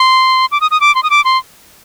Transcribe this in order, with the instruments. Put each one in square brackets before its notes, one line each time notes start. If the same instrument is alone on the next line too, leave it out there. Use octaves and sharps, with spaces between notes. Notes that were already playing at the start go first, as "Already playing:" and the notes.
Already playing: [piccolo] C6
D6
D#6
D#6
D6
C6
D#6
D6
C6